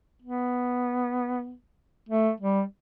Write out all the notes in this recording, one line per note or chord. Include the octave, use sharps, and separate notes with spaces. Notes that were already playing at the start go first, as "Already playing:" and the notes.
B3
A3
G3